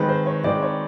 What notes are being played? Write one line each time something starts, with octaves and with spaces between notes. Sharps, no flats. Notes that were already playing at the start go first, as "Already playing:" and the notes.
Already playing: D#3 G#3 C4 B4
C5
C#5
D#3 G#3 C4 D5
C#5